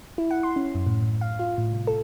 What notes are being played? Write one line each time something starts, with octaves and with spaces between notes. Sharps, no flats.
E4
F#5
C6
C#4
F#2
A2
A2
F5
F4
A2
C2
A4